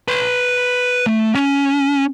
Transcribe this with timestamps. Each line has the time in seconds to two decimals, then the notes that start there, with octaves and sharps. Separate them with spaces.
0.08 B4 C6
1.06 A3
1.35 C#4